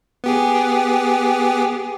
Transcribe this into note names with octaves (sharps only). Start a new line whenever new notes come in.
B3 G4 G#4